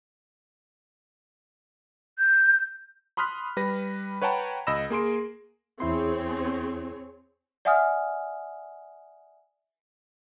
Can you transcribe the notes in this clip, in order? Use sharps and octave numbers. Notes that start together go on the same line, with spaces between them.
G6
B5 C6 D#6 F6 F#6 B6
G3 B4 A#6
B4 C#5 F#5 G5 A5 A#5
C#2 D#5 B5 E6 A#6 E7
A#3 G#4 C6 D7
E2 C4 E4 G#4 C#5 C6
D5 E5 F#5 G#5 D#6 F6